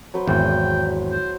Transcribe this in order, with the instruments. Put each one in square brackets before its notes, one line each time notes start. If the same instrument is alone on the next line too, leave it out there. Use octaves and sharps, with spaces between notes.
[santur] F#3 B4 C5
[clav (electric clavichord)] G#1 E2 [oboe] G5
[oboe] C5